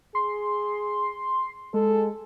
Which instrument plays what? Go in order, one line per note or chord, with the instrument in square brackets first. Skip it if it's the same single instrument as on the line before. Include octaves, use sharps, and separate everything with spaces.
[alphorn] G#4 [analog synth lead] C6
[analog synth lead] G#3 [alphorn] A4